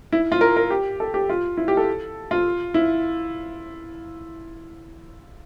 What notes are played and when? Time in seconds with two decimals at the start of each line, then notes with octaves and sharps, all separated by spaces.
0.12 E4
0.32 F4
0.41 A#4
0.57 A#4
0.70 G4
1.00 A4
1.14 G4
1.29 F4
1.57 E4
1.68 G4
1.77 A4
2.31 F4
2.74 E4